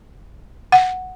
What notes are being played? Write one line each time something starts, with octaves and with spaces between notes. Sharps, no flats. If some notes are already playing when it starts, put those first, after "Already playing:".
F#5